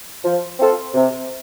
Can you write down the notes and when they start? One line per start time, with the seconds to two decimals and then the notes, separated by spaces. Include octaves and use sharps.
0.25 F3
0.60 C4 F4 A4
0.94 C3